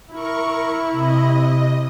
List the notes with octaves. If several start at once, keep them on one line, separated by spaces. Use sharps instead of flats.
E4 A#4 C#6
C3 D#5